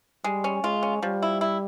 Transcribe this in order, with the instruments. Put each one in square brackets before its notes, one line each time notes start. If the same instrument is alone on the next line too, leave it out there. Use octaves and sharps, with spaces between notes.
[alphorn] G3 [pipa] G#3
[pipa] C#4
[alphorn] G#3 [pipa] F4
[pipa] C#4
[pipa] F3 [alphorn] G3
[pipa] E4
E4